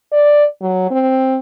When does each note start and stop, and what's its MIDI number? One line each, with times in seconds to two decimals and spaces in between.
0.12 0.45 74
0.61 0.88 54
0.91 1.39 60